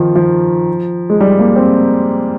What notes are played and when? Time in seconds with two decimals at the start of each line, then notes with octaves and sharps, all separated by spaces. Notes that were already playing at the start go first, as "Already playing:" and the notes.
Already playing: D#3 F3
0.15 F3
1.10 G#3
1.20 G3
1.39 A#3
1.56 C4